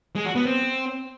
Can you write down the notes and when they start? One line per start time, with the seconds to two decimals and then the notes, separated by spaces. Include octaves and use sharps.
0.16 G#3
0.26 F#4
0.35 B3
0.45 C4